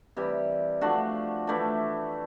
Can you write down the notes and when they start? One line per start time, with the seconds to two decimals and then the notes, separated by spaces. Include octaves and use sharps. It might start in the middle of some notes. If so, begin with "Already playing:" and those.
0.17 C3 E3 G3
0.81 F3 A3 D4 F#4
1.47 E3 A3 D4